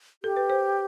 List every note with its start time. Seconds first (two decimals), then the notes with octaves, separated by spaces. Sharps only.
0.23 G4 A4
0.36 B4
0.50 C5